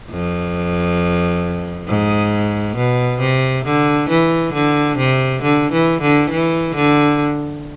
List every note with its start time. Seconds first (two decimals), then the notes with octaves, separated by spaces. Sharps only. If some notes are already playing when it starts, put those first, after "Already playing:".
0.11 F2
1.87 G#2
2.76 B2
3.20 C3
3.65 D3
4.09 E3
4.53 D3
4.98 C3
5.42 D3
5.72 E3
6.01 D3
6.30 E3
6.75 D3